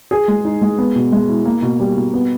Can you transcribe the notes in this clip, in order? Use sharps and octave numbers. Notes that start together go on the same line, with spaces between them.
G#4
G#3
D#4
G#3
B3
B2
G#3
E4
A#3
B2
G3
B2
B3